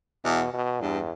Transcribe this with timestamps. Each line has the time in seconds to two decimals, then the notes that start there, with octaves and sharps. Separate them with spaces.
0.24 E2 B2
0.53 B2
0.81 E2 G2